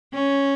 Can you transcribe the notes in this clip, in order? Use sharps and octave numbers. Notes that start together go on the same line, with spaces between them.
C#4